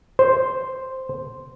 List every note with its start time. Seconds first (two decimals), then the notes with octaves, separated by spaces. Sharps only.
0.19 C5